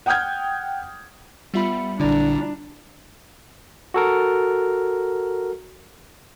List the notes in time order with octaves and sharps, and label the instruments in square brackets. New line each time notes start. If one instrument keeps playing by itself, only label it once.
[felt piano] F#5 G5 D#6 F6 G6 G#6
[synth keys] G3 F4 C#7 [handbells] B3 E5 B5
[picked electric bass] A#1 D3 [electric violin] D4 [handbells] E4 D5 A#5
[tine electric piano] F#4 A4 A#4